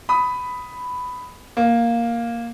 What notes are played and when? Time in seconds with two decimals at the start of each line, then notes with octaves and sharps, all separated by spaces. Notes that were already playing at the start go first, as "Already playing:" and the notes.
0.09 B5 D#6
1.57 A#3